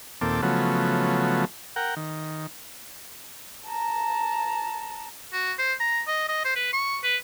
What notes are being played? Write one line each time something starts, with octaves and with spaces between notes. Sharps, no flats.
D#2 A#2 C4 A4 D6
C#3 F3 F#3 A3 B3
A#4 F#5 G5
D#3
A5 A#5
F#4
C5
A#5
D#5
D#5
C5
B4
C#6
B4